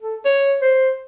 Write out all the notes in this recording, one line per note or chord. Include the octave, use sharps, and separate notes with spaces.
A4
C#5
C5